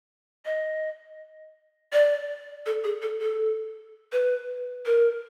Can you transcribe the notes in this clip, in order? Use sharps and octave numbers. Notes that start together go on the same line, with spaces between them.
D#5
D5
A4
G#4
A4
A4
B4
A#4